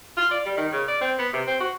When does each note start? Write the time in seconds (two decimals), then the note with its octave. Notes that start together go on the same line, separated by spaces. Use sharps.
0.17 F4
0.31 D5
0.46 G3
0.57 D#3
0.72 C#3
0.88 D5
1.01 C4
1.19 B3
1.33 C3
1.47 C4
1.60 F#4